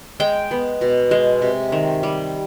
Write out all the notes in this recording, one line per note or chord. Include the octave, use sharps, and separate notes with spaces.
G#3 G5
B3
B2
G#3
C3
D#3
G3